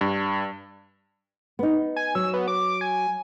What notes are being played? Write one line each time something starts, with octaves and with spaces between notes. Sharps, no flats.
G2
B3 D#4
G#5
F#3 E6
B3
D6
G#5